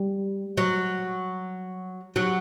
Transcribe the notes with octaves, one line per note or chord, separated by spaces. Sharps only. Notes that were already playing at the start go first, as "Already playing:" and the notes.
Already playing: G3
F#3
F#3